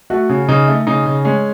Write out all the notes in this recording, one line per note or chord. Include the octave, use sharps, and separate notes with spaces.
A3 F#4
C#3
C#3 D#4
A3
C#3 D#4
C#3
G#3 C#4